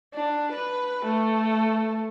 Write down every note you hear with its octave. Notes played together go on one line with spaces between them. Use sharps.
D4
B4
A3